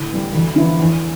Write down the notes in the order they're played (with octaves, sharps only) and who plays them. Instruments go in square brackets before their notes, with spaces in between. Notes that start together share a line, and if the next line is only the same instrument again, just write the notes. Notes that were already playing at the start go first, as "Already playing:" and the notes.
Already playing: [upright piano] A2 [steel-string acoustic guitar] D3
[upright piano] E3 G3
[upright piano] D2 [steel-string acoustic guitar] E3
[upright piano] D3 F3 B3 E4
[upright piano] E2 [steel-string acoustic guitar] E3